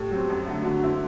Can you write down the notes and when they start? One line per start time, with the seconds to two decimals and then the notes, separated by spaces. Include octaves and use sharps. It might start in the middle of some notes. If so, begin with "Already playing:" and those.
Already playing: A2 G4
0.11 F#3 C4
0.30 F#2
0.46 D3 F#3 A3
0.65 D3 F#4
0.83 A3 C4 E4